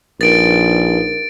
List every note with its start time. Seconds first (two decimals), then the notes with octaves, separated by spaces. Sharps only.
0.21 A#1 D#4 A#4 B4 A6 D7